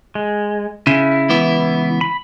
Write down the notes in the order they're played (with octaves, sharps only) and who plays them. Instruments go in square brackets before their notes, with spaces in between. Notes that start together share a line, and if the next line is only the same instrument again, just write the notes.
[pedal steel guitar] G#3
[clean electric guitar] C#3 [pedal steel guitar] E4
[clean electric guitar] C#2 E3 B3
[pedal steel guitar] B5